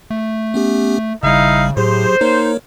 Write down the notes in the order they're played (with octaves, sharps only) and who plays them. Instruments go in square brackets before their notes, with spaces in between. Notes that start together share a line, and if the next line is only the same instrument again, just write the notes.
[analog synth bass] A3
[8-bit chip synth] B3 C#4 G4
[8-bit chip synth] G#1 G3 [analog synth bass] C#3 [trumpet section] D#4 E4 F5
[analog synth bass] A2 [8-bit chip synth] F#3 G4 G#4 [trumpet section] C5
[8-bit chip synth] A#3 A#4 C#5 [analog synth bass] D#4